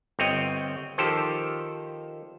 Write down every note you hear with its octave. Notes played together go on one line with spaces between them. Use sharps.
G1 C4 C#5 D#5 G5
D#3 F3 G4 A4 C5